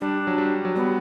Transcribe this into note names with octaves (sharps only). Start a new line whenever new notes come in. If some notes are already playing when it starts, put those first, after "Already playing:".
G3 D4
F#3
G3
F#3
G3 B3